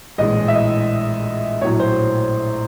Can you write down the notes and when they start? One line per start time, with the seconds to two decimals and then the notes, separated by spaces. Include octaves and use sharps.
0.18 A#1 A2 E3 G#3 D#5
0.48 E5
0.55 D#5
1.61 A#1 A2 F#3 C#5
1.80 C5